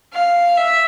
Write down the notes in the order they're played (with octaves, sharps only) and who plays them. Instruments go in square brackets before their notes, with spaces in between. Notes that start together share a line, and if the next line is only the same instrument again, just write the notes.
[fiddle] F5
E5